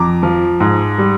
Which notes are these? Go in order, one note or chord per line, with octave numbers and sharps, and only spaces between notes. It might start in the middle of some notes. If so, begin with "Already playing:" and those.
Already playing: F2 A#5 D6
F3
G#2
G3